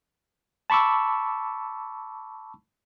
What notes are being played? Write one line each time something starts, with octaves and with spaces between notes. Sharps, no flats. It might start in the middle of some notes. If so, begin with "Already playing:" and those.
A5 B5 C#6 D6 E6